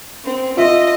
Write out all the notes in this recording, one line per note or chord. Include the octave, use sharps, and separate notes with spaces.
C4
F4 D#5 E5